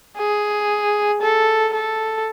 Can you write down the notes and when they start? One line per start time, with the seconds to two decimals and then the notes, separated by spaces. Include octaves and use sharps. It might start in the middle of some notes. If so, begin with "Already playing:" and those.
0.18 G#4
1.22 A4
1.74 A4